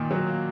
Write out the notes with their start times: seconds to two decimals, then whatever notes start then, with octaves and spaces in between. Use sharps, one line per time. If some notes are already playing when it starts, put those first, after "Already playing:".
Already playing: A#2 D#3
0.11 F#3
0.26 A#3